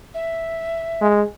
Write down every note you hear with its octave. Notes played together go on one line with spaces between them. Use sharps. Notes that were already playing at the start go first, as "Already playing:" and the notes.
E5
G#3